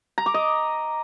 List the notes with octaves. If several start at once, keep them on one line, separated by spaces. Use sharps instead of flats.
A#5
D6
D#5